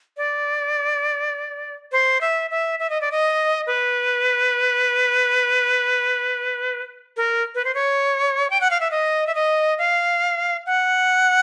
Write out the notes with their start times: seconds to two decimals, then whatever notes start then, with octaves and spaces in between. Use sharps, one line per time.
0.17 D5
1.92 C5
2.21 E5
2.51 E5
2.79 E5
2.90 D#5
3.01 D5
3.12 D#5
3.67 B4
7.17 A#4
7.55 B4
7.65 C5
7.75 C#5
8.50 G5
8.61 F#5
8.71 F5
8.80 E5
8.91 D#5
9.27 E5
9.35 D#5
9.78 F5
10.66 F#5